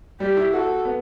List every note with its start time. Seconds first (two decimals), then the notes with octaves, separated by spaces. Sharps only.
0.20 G3 G4
0.37 E4
0.53 F#4 A4
0.85 B3